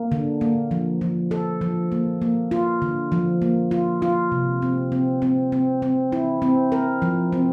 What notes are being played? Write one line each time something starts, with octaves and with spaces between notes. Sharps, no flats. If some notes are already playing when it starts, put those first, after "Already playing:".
Already playing: A#3
D3
A#3
F3
F3
A4
F3
A#3
A#3
F4
D3
F3
A#3
F4
F4
C3
C4
C4
C4
C4
C4
E4
C4
A#4
F3
C4